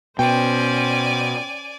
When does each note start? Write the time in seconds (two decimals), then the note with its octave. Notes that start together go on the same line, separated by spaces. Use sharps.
0.19 B2 C#4 C5 D5 G5 G#5